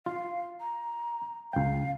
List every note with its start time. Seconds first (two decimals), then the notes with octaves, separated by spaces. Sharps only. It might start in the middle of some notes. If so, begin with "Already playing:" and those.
0.06 F4 F5
0.60 A#5
1.53 C#2 F5 G5